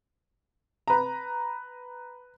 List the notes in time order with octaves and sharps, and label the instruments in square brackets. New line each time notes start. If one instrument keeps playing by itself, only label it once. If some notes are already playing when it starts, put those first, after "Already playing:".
[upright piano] B4 A#5